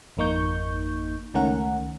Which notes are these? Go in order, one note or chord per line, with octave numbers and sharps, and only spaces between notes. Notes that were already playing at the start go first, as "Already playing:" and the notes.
G#1 F2 A#3 D#4 C#6 G6
C#2 D#3 A3 C#4 A#4 F#5